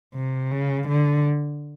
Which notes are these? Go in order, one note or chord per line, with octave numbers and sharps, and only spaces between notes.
C3
C#3
D3